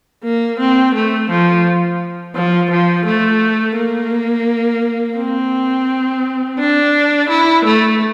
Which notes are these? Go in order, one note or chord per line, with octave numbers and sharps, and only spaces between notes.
A#3
C4
A3
F3
F3
F3
A3
A#3
C4
D4
E4
A3